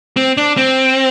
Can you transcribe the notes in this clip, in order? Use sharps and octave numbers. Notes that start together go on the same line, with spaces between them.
C4
D4
C4